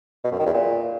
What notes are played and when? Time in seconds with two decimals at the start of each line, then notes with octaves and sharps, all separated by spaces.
0.25 B2
0.32 F#2
0.39 D#3
0.46 E2
0.53 A#2